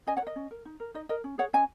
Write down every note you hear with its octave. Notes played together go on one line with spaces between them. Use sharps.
C#4 D#5 G#5
C#5 F#5
A#4 D#5
C#4
A#4
D#4
A#4
D#4 D#5
A#4 D#5
C#4
G#4 C#5 F#5
C#4 D#5 G#5